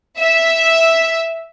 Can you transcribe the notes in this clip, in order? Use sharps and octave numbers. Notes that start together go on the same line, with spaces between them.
E5